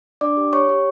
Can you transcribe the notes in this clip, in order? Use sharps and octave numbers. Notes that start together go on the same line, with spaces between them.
D4 D5 D6
G4
G4 C#5 C#6
G4